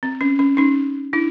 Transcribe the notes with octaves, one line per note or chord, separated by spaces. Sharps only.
C4
C#4
C#4
C#4 D#4
D4 E4